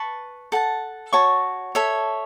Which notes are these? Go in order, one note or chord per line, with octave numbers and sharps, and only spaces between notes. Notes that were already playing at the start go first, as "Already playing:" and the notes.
Already playing: B4 A5 C#6
A4 F#5 A5
F#4 C#5 A5 C#6
A4 C#5 E5